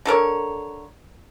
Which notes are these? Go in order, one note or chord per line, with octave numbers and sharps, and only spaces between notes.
D3 A4 A#4 C#5